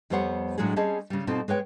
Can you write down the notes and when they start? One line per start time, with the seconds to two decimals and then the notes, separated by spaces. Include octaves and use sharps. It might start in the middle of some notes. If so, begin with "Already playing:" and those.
0.10 F2 G3 B3 C5 C#5 F#5
0.58 A2 F#3 G#3 C#4 D4 G#4
0.76 G3 C4 C#4 G#4 D#5 A5
1.10 C#3 G3
1.27 B2 C4 D#4 F4 A4
1.48 G#3 B4 C#5 G5